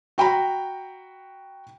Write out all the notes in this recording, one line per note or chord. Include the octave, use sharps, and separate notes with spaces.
F#4 G5 A#5 B5